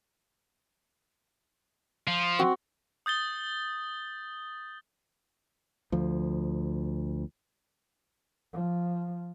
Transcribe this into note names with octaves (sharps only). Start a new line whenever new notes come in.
F3 F4
C4 F#4
D#6 G6 A6 G7
D2 F3
F3